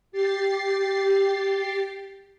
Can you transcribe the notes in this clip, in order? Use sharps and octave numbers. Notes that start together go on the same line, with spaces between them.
G4 A6 C7